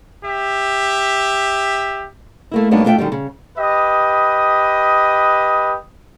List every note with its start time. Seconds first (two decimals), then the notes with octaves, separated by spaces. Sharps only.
0.25 G4 E5
2.51 A3 A#3 E4
2.71 G2 F#3 A#3 B3 D4 D#4
2.84 A3 D4 F4 A4 E5 G5
2.98 F#2 D3 D#3 G3
3.12 C#3
3.58 G4 B4 D#5 D#6